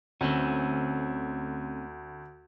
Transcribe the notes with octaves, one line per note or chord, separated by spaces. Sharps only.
D2 A3 C4 C#4